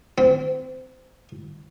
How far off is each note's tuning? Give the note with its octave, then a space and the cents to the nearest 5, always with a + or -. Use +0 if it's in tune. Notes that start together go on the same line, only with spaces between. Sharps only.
C4 -25